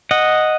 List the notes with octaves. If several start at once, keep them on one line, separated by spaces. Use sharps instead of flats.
D#5 F#5